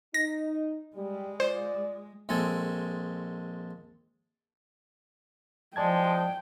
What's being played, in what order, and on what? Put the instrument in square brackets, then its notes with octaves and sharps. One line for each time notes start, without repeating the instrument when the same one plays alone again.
[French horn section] D#4 [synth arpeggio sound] A#6
[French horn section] G3 [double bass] G#3
[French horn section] F4 D5 [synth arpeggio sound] C5
[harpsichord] A#1 G#3 C4 A4 G#5
[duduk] F3 [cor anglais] G#3 [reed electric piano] D5 A5 G#6 [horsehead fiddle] G5